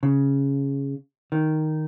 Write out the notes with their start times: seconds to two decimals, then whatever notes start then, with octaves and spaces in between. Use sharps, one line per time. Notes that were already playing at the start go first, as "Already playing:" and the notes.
0.03 C#3
1.32 D#3